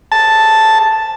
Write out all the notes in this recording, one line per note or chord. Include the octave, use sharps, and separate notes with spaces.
A5